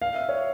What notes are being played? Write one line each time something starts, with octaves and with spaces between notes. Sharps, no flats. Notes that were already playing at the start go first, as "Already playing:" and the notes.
F5
E5
C#5